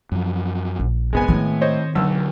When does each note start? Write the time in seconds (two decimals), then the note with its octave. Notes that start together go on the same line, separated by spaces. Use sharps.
0.12 F#2 F3
0.79 A#1
1.13 F1 G#3 B3 G#5
1.28 A2 D#3 C4
1.61 C5 C#5 D#5
1.95 B1 D3 F#3 E6